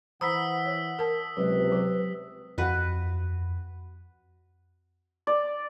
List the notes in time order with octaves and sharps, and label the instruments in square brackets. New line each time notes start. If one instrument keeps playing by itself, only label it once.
[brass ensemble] E3 F#5 [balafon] C5 A#5 B5 [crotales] D#6 E6 B6
[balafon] C#5
A#4 A5
[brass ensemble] C#2 C3 [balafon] F#3 G#3 [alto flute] B4
[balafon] F#3 G4
[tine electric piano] F2 [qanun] F#4 B4
[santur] D5